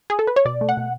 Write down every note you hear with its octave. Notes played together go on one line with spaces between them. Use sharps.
G#4
A4
B4
C#5
B2 D5
A3
F#5
B2